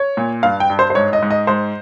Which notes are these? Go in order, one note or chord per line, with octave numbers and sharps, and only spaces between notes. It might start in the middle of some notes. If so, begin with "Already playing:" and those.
Already playing: C#5
A#2
G2 F5
G5
G2
C5
C5
G#2 C#5
D#5
G#2
D#5
G#2 C5